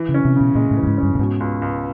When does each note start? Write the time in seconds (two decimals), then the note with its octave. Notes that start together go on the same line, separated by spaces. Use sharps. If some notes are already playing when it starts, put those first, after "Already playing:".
Already playing: E3
0.09 C#3
0.14 C#4
0.25 C3
0.35 C#3
0.41 B2
0.55 A#2 G#3
0.71 A2
0.77 E3
0.83 G2
0.87 G#2
0.98 G2 C#4
1.15 A2
1.19 G#2 B2
1.40 C#2
1.62 C#2